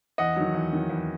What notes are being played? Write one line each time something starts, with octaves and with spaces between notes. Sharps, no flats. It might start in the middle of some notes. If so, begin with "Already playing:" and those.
E2 D#5 F#5
D#3 F#3
E2
D#3 F#3
E2